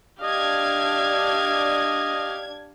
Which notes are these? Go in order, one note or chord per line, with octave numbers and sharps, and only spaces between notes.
D4 G4 D#5 F5 G#6